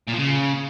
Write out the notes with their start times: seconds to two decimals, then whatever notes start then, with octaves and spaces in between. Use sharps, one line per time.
0.07 A#2
0.13 F3
0.18 C#3